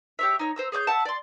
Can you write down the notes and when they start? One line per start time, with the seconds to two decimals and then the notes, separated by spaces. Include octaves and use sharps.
0.19 G4 C#5 E5
0.39 D#4 C#5
0.56 C5 A#5 E6
0.72 G#4 C#5 D6 G6
0.87 E5 F#5 A5
1.05 D5 C6